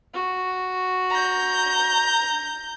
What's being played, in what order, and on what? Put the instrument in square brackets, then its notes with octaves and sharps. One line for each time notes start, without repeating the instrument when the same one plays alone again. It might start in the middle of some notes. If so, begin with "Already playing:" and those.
[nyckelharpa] F#4
[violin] A#5 G6